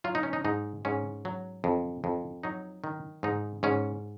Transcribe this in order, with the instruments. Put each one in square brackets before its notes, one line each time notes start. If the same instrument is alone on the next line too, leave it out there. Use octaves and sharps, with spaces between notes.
[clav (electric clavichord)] F#3 F4
D#4
C#4
D#4
G#2 D#4
G#2 C#4
F#3
F2
F2
F#3 D#4
D#3
G#2 D#4
G#2 C#4